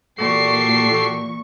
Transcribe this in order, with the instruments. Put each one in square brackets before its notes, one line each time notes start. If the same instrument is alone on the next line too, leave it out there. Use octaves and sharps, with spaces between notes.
[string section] A#2 E3 C#6 [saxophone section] F#4 G4 A4 [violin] C7